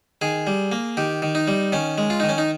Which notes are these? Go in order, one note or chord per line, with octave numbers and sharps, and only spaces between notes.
D#3 G#4
G3
A#3
D#3 G4
D#3
D#4
G3
D#3 C#4
G#3
F4
D#3 D#4
C#4
D#4